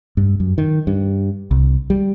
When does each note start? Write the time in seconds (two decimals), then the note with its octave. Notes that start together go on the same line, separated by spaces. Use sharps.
0.17 G2
0.40 F#2
0.58 D#3
0.87 G2
1.51 C2
1.90 G3